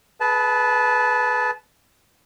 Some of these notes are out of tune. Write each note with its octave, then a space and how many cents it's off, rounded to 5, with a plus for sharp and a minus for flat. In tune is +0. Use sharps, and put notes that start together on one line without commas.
G#4 +25 B4 +0 A5 -20